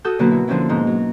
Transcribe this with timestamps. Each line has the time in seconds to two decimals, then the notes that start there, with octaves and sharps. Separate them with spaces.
0.04 F#4 A4 D#6 G6
0.19 B2 D3 F#3 A#3 F#4 B4
0.31 E4
0.47 D3 F3 C4 C#4 E4
0.69 G#2 B2 D#4
0.87 F#3